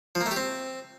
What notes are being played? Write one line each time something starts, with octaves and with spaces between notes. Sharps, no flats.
F3
A#3
A3
G4
C4